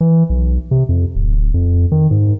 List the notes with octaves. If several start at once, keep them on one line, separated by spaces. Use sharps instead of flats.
E3
B1
C3
F2
D1
F2
D#3
G#2